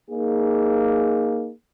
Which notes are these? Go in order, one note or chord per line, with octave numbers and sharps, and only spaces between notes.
A#3 D#4 G#4